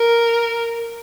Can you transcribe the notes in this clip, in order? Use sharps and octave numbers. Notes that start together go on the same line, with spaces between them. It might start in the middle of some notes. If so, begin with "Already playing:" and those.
Already playing: A#4